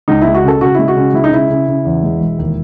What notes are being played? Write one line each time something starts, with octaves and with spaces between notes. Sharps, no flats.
C#2 D#4
G#3 E4
F#4
C#3 A4
C#3 F#4
G#3 E4
F#4
C#3
G#3 E4
D#4
C#3 E4
C#3
C#3
E2
G#3
E1
D#2